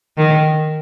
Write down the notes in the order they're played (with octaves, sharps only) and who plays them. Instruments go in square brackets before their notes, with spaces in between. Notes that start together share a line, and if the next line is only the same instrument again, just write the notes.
[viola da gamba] D#3